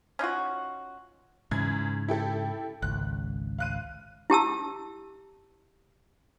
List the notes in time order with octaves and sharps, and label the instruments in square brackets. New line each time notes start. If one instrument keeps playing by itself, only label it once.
[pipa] C#4 D#4 F4 F#4
[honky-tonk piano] E2 G#6 [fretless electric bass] G#2 C#3
[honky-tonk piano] E4 G4 A4
[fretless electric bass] G#1 C#2 [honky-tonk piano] F#6
[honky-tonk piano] F5 F#6 D#7
[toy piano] E4 G4 A5 E6